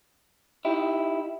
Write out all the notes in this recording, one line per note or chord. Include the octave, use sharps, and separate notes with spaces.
D#4 E4 G4